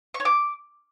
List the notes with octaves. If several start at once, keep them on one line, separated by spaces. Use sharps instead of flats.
C#6
C#5
D6